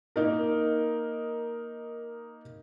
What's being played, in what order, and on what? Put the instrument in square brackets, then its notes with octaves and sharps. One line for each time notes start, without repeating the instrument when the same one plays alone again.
[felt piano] A#3 D#4 A#4